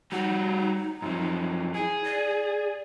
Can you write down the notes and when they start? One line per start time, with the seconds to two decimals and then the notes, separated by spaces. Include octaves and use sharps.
0.12 G3 D#4 F#4
1.02 F#2 F3
1.75 E4 G#4
2.04 D5